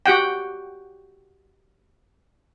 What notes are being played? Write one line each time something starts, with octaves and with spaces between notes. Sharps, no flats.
F#4 G4 F#5 G5